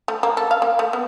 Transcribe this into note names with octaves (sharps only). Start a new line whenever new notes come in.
A3
A#3
A4
F5
A#3
A3
B3